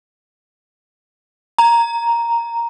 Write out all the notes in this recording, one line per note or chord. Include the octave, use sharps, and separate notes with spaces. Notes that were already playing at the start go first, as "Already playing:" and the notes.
A#5